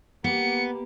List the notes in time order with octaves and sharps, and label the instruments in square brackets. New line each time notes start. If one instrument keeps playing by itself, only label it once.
[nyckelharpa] A#3 G4 [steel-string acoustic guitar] B3 [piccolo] C#7